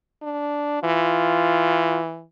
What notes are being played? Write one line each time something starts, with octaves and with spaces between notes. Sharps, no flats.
D4
E3 F4